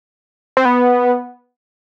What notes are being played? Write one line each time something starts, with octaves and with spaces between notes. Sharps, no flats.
C4
B3